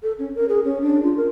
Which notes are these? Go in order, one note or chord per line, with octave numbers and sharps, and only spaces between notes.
A4
C#4
A#4
G#4
C#4
D4
F4
A#4